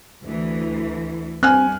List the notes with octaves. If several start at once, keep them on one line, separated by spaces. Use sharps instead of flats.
D2 E3
G2 C4 G#5 F6 F#6